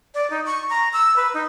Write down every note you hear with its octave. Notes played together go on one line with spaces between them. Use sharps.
D5
D#4
C#6
A#5
E6
B4
D#4